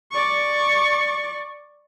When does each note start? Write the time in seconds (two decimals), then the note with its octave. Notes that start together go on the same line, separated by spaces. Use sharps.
0.11 D5 C#6